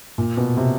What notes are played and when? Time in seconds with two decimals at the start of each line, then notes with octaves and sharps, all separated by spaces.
0.18 A#2
0.37 B2
0.57 C3